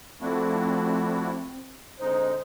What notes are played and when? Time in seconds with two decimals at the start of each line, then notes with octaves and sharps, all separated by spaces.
0.21 F3 A3 C4 D4 E4 F#4
2.00 D3 G#3 C4 D#4 C5